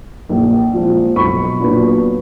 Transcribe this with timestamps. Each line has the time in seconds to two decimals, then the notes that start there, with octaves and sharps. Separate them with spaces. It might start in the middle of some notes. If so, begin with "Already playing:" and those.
0.29 A#1
0.73 A#2 F3 G#3 C4
1.16 B1 B5 C#6
1.60 A#2 F#3 B3 D4